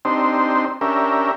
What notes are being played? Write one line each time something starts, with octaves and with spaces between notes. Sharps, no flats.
C4 D4 D#4 G4 C5
C#4 D4 G4 A#4 E5